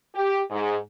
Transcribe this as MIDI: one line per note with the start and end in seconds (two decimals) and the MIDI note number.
0.14 0.40 67
0.50 0.76 44